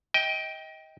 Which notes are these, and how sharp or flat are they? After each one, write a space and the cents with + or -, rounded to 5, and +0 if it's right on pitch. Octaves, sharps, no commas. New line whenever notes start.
D#5 +30 G5 +0